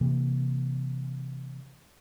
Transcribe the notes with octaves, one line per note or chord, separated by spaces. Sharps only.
C3 E3 A#3